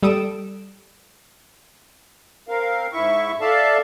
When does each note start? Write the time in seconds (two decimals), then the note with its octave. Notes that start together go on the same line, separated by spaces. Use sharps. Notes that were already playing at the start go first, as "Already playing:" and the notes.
0.03 G3 A4 D#6 D7 E7
2.48 C4 A#4 F5
2.93 G#2 E4 E5 C#6
3.41 A4 D5 E5 F5 A5